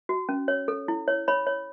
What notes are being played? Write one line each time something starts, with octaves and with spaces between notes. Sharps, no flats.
F#4
C#4
C#5
A4
E4
C#5
C#5 B5
C#5